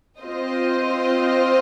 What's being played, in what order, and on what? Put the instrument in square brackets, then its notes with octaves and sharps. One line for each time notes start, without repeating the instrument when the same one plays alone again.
[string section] C4 F4 C5 D#5